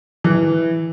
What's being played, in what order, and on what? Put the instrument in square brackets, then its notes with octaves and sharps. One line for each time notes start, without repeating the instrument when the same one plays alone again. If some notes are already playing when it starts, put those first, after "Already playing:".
[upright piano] E3